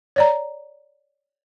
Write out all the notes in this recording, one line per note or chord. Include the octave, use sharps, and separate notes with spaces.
C#5 D5 A#5